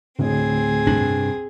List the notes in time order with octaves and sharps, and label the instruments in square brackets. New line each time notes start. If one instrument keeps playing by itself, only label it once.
[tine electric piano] D2 [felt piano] A2 [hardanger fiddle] C4 G#4
[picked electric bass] C2 G2 D4